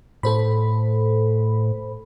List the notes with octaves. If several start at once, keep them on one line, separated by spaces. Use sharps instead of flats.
A2 A4 C5 B5